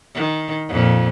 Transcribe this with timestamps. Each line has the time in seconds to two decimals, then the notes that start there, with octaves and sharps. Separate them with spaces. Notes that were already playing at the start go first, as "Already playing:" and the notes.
0.15 D#3
0.69 F2 A#2